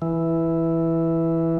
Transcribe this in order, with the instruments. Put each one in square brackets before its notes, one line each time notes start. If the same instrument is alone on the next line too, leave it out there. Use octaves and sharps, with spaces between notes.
[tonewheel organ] E3